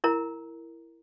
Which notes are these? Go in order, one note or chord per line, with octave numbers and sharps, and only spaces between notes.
E4 A#4 A#5